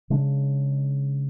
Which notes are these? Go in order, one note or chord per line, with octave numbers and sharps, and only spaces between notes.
C#3 G#3 D4